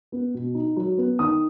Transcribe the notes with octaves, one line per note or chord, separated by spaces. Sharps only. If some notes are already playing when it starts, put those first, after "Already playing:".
B3
B2
D#4
F#3
B3
D#3 D#6